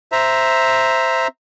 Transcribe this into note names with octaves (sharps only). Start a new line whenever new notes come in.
C5 E5 A#5